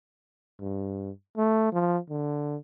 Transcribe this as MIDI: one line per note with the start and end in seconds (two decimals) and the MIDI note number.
0.60 1.10 43
1.38 1.72 57
1.73 1.98 53
2.10 2.56 50